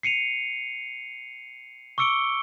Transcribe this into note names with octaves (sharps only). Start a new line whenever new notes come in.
C7 C#7 D#7 F7
C#6 D6 E6 C#7 D7 G7